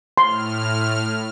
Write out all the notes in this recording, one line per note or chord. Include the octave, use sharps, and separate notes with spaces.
A2 C6 F6